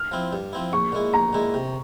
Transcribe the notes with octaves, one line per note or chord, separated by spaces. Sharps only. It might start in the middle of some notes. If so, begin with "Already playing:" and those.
Already playing: F6
F3 C4 E4
G2
F3 C4 E4
A#1 C#6
A#2 G#3 E4
A#1 A#5
A#2 G#3 E4
C3